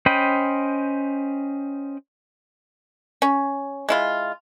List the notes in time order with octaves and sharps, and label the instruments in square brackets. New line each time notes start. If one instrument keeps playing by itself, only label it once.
[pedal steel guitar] C#4 C5 D#5 G5 B5
[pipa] C#4
G#3 E4 F4